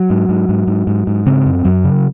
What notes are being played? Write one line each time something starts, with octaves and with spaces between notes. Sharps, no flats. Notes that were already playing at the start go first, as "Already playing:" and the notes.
Already playing: F#3
G#2
G#2
G#2
G#2
G#2
G#2
C#3 C4
F#2
F#2 F#3
C#3